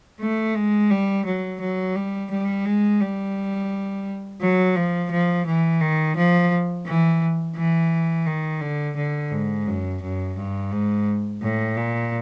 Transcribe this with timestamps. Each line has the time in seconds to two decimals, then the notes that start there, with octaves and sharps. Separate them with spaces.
0.20 A3
0.55 G#3
0.90 G3
1.25 F#3
1.60 F#3
1.95 G3
2.30 G3
2.66 G#3
3.01 G3
4.41 F#3
4.75 F3
5.11 F3
5.46 E3
5.81 D#3
6.16 F3
6.86 E3
7.56 E3
8.26 D#3
8.61 D3
8.96 D3
9.31 G#2
9.67 F#2
10.02 F#2
10.36 G2
10.72 G#2
11.42 A2
11.77 A#2